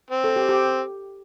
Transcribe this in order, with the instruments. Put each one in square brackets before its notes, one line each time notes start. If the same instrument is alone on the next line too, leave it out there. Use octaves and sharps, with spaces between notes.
[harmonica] C4
[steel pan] A4
G4
G4